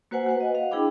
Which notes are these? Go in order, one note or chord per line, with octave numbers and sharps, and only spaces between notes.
A#3 F#4 B4 C5 F#5 G#5
F#4 B4 F#5
D#5
F5
D4 E4 G#4 G5 B5 D6